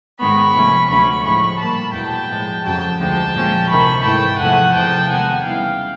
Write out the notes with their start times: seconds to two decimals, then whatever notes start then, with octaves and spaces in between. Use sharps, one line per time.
0.19 G#2 D#3 G#3 B3 B5 C#6
0.54 C3 F3 A3 C#4
0.89 D2 D3 F#3 A3 C#4 B5 C#6
1.24 A2 F3 G#3 B5 C#6
1.59 A#2 G3 A#3 A5 B5
1.94 E2 B2 F#3 G5 A5
2.29 A2 F3 G#3
2.64 F2 C#3 F#3 G5 A5
2.99 D2 D3 F3 G#3 G5 A5
3.34 A#2 F3 G#3 C#4
3.69 D2 C3 D#3 B5 C#6
4.04 G#2 E3 A3 G5 A5
4.39 E2 C3 F3 A3 F#5 G#5
4.74 E2 C3 F3 G5 A5
5.09 C3 D#3 G#3 B3 F#5 G#5
5.44 C#3 E3 G3 B3 F5 G5